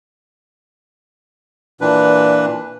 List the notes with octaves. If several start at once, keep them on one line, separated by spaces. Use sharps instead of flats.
A#2 E3 D4 B4